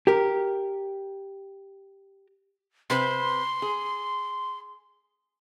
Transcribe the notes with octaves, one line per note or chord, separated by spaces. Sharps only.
G4 A#4
C3 B4 C5 C6
G#4